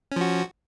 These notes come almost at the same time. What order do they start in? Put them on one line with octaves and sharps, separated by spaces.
C#4 F3 F#4